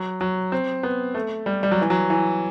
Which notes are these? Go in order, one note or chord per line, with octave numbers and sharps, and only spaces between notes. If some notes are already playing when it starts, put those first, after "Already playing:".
Already playing: F#3
F#3
C4
B3
A3
G3
G3
F#3
E3
F#3
E3